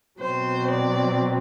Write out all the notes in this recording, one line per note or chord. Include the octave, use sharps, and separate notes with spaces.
B2 F#3 C4 C5
D5